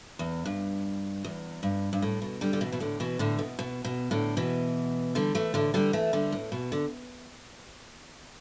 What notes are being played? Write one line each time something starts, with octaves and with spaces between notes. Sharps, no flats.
E2
G2
E2
G2
G2
A2
B2
D3 G3
D3
B2 E3
B2
A2 D3
B2 E3
A2 D3
B2
B2
B2
A2 D3
B2 E3
D3 G3
E3 A3
A2 D3
D3 G3
E3 A3
D3 G3
A2
B2
D3